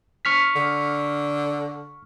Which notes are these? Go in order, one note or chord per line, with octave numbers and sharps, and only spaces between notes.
C#6 F6 B6
D3